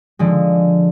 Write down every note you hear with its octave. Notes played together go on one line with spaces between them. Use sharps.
D3 F3 G#3